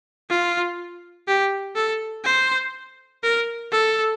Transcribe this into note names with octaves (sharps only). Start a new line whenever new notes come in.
F4
G4
A4
C5
A#4
A4